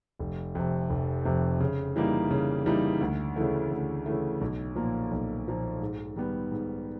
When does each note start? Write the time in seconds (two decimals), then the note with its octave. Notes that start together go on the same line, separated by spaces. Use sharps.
0.19 F1
0.55 F2 C3
0.90 F1
1.25 F2 C3
1.60 C#3
1.96 E3 G3 A#3 D#4
2.31 C#3
2.66 E3 G3 A#3 D#4
3.01 D2
3.36 C#3 E3 A3
3.71 D2
4.06 C#3 E3 A3
4.41 B1
4.76 A#2 F3 A#3
5.11 B1
5.46 A#2 F3 A#3
5.81 G#2
6.16 D#3 G3 B3
6.52 G#2